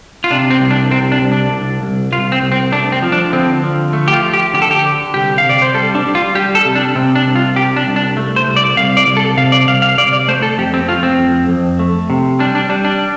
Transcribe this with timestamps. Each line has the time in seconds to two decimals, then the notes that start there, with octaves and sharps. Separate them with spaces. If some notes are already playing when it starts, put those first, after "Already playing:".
0.24 F4
0.31 C3 D4
0.51 C4
0.60 C2
0.71 D4
0.91 C3 C4
1.12 D4
1.21 C2
1.32 D4
1.51 C2
1.82 C2
2.12 C2 F4
2.32 C4
2.42 C2
2.52 C4
2.72 A3 D4
2.92 C4
3.02 F3
3.12 D4
3.33 D3 C4
3.63 F3
3.93 A3
4.08 G4
4.13 F4
4.23 F3
4.34 G4
4.54 D3 G4
4.62 A4
4.71 G4
4.84 D3
5.14 C2 G4
5.38 F5
5.44 C3
5.50 D5
5.62 C5
5.74 G3 A4
5.95 D4
6.05 G3
6.15 F4
6.35 G3 G4
6.55 A4
6.65 C3
6.75 D4
6.95 C3 C4
7.15 D4
7.25 C2
7.35 F4
7.56 C3 G4
7.76 D4
7.87 C2
7.96 D4
8.17 A3
8.36 C5
8.47 C2
8.56 D5
8.76 C2 F5
8.97 D5
9.07 C2
9.17 A4
9.37 C3 F5
9.52 D5
9.68 C2 F5
9.82 F5
9.98 C3 D5
10.13 D5
10.28 A3 C5
10.42 A4
10.58 F2 G4
10.74 C4
10.88 A3 F4
11.03 C4
11.19 F2
11.49 F2
11.79 A3
12.10 C3
12.39 G3 D4
12.55 D4
12.69 G3 D4
12.85 D4